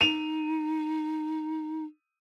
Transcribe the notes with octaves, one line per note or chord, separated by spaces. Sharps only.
D#4 D#7 F7